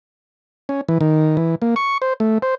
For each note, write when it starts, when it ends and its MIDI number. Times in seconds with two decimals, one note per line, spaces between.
0.69 0.81 61
0.89 0.98 52
1.01 1.37 51
1.37 1.55 52
1.62 1.75 58
1.76 1.98 85
2.02 2.13 72
2.20 2.38 57
2.42 2.55 72